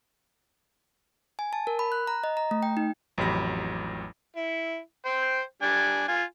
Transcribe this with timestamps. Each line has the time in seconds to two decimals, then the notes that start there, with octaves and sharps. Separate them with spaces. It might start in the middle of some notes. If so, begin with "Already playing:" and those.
1.39 G#5
1.53 A5
1.67 A#4
1.79 B5
1.92 F#6
2.07 A#5
2.24 D#5
2.37 A#5
2.51 A3
2.63 G5
2.77 D#4
3.18 A1 F2 F#3 G4 B5 A#6
4.36 E4
5.05 C5 G5
5.62 G3 D4 G#5
6.08 F4 G#5